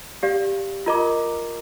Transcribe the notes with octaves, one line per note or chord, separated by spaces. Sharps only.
G4 D5 F5
F4 A#4 D#5 A#5 D6